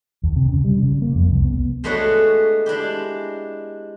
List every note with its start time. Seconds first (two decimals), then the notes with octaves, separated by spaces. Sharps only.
0.23 D#2
0.36 C3
0.49 C#3
0.64 G3
0.83 C#3
1.02 A#3
1.15 F2
1.30 C2
1.45 B3
1.84 G#3 A3 B3 D4 F#4 C#5
2.66 G#3 D4 E4 G4